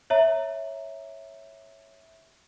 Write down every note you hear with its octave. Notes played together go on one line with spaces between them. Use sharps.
C#5 E5 A#5